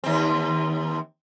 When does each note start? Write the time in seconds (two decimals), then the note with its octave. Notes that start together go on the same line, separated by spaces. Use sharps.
0.04 D#2 C4